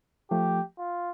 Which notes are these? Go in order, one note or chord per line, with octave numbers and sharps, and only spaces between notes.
F3 A3 G4
F4